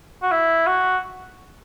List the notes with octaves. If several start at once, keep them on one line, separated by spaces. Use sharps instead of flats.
F#4
E4
F#4